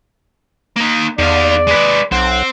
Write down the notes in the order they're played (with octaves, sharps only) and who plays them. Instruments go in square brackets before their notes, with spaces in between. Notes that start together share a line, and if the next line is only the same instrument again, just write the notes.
[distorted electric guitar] A#3 D#4
[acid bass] E2 [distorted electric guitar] D#3 F5 [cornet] D5
[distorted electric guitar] G#3 B4
[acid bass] B1 [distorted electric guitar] C4 [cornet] F#5